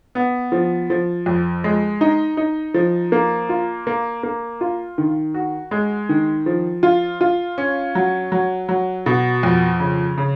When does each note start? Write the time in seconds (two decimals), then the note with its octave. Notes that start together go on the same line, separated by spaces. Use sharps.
0.15 B3
0.52 F3
0.90 F3
1.26 F2
1.64 G#3
2.01 D#4
2.37 D#4
2.74 F3
3.12 A#3
3.49 F4
3.87 A#3
4.23 A#3
4.61 F4
4.98 D#3
5.34 F#4
5.71 G#3
6.09 D#3
6.46 F3
6.83 F4
7.21 F4
7.58 C#4
7.95 F#3
8.32 F#3
8.69 F#3
9.06 B2
9.43 F2
9.80 C#3
10.18 C#3